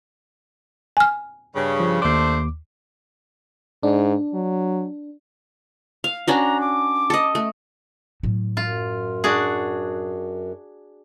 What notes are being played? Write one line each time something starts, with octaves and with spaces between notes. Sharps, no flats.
G#5 F6
G2 C#3
F3
D#2 A3 D4 C5 D6
G#2 D4
F#3
F5
C#4 D4 F#4 A#5
D6
A4 D#5
A3
A2 F#3
F#2 F4
D4 F#4 G#4